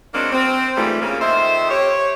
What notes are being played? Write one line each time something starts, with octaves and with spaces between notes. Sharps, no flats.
F#3 G#3 A#3 C4 D4
C4
G#2 E3 G3 A3 F4
C#3 A#3
F2 D#3 C5 E5
G4 C#5